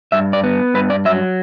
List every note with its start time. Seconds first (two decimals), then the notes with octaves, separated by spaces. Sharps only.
0.12 G2 E5
0.33 D5
0.44 B3
0.74 G2 B4
0.90 D5
1.05 F#3 E5